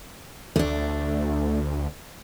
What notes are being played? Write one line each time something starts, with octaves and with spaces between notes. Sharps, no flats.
D2 A3 D4